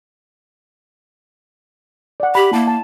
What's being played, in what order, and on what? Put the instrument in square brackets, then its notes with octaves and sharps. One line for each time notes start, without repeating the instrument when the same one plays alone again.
[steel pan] D5 F#5
[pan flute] G4 [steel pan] B5
[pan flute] A#3 [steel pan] E4 A5
[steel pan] A5